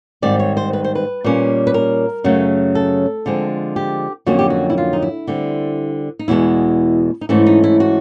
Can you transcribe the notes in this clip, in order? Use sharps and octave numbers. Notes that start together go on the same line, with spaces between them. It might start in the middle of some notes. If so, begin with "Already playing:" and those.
G#2 D#3 G3 C4 D5
C#5
C5
B4
C5
B4
A#2 G3 A#3 C#4
B4
A#4
F#2 C#3 F#3 A3
A4
D3 F3 G#3 C4
G4
F2 D3 F#3 A#3 C#4 F#4
G4
F#4
E4
F4
D#4
E4
D3 G3 C4
D#4
E2 B2 G#3 B3 E4
D#4
G#2 E3 A3 C#4 E4
D#4
E4
F#4